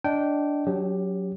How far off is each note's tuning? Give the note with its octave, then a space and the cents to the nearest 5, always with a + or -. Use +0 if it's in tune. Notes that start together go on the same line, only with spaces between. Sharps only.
D4 -10 D#5 +0 G5 -15
F#3 +0 C#4 +40 G4 +10